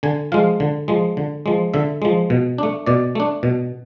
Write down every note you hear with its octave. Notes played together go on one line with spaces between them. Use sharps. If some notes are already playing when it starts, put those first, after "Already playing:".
D3 G#5
F3 G#3 F5
D3
F3 G#3
D3
F3 G#3
D3 E5
F3 G#3
B2
A3 D4
B2 D5
A3 D4
B2